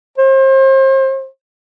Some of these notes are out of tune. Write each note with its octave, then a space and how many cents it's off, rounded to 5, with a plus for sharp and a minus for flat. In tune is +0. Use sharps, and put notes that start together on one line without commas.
C5 +35